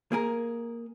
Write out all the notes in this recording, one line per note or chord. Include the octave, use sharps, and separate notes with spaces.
A#3 G#4 A#4